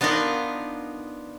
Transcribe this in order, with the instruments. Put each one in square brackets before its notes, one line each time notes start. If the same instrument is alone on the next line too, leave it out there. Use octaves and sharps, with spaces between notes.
[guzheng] B3 D4 D#4 F4 A#4 B4